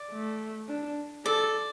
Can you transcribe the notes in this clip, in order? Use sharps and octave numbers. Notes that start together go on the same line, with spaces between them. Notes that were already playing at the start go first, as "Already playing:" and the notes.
Already playing: D5
A3
D4
A4 D5